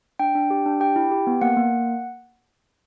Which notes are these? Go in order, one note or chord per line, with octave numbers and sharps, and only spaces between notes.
D4 G5
D4
G4
D4
G4 G5
E4
G4
B3
A#3 F#5
A#3